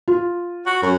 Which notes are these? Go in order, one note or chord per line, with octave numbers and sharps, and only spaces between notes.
F4
F#4
F#2